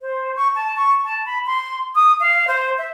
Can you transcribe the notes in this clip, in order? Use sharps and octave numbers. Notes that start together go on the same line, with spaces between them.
C5
C#6
A5
C#6
A5
B5
C6
D#6
F5
C5
E5